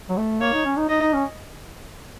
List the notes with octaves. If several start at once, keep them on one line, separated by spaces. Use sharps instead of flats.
F#3
A3
A#3 C#5
D#4
C#4
D#4
D#4 D#5
D#4
C#4